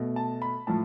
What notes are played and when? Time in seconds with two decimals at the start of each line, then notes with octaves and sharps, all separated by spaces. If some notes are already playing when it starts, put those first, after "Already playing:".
Already playing: B2 A3
0.16 A5
0.42 B5
0.67 A2 F3 A5